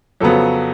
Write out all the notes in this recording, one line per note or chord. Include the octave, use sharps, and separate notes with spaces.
F2 C#3 F#3 B3 A4